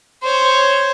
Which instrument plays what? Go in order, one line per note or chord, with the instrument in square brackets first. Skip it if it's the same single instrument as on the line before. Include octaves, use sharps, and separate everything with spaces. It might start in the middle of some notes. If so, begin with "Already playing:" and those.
[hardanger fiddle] C5 C#5